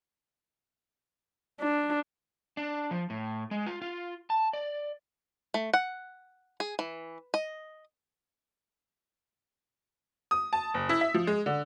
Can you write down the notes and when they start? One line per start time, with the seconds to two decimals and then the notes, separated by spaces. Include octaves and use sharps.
1.60 D4
2.57 D4
2.91 F3
3.10 A2
3.51 G#3
3.67 F4
3.82 F4
4.30 A5
4.53 D5
5.54 A3
5.74 F#5
6.60 G#4
6.79 E3
7.34 D#5
10.31 D#6
10.53 A5
10.74 F#1
10.89 E4
11.01 E5
11.14 F3
11.27 G#3
11.46 D3